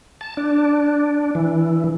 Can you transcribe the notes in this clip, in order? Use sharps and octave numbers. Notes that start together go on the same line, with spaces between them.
A5
D4
E3